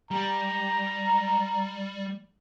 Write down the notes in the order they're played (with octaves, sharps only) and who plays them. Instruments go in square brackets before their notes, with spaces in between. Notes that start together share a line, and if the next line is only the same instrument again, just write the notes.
[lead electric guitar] G3 [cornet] A#5